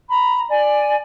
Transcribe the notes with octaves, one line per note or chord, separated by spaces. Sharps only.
A#5 B5
D5 G#5